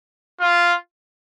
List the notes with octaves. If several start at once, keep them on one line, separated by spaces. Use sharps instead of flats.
F4